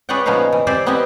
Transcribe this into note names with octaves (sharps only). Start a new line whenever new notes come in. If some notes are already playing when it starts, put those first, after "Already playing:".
G#4 B4 C#5 D5 F#5 G5
A#2 F3 B3 C#4 D#4 F5
E3
C4 G4 C5 D5 G#5
B3 C4 E4 G4 D#5 G#5